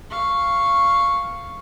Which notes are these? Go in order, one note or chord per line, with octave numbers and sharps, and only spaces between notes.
F5 C#6